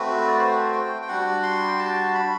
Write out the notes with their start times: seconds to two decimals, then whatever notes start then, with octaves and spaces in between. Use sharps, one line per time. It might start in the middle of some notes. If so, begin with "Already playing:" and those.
Already playing: A3 C4 F#4 B4
0.28 D5
0.38 C5
0.72 G5
1.02 G5
1.08 G3 D4 F#4 F#5
1.43 C6
1.68 G5
1.79 A5
2.14 B5